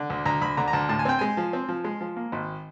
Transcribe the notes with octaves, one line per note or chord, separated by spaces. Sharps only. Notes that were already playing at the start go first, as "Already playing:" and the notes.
Already playing: D3
D2
D2 A#5
D2 B5
D3 A#5
A#5
D2 A5
A2 A5
G#5
C4 G5
G#3 G#5
F3
C4
F3
G#3
F3
A#3
G#1